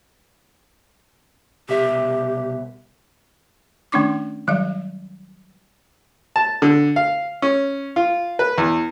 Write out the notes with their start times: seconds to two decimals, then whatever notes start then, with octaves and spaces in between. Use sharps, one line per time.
1.69 C2 B2 G4 E5
3.92 D#3 A3 C#4 D4 C#6 D6
4.47 D#3 F#3 G3 D#5
6.36 A5
6.62 D3
6.96 F5
7.42 C#4
7.96 F4
8.39 B4
8.58 E2